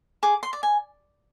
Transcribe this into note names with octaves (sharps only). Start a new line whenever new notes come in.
G#4 D6
C6
D5
G#5